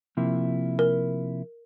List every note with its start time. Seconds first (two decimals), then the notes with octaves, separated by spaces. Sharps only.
0.17 C3 F3 A#3 E4
0.79 A#4